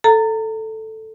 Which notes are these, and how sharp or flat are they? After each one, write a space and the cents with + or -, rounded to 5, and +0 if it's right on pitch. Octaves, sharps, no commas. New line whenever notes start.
A4 +0 A#5 -30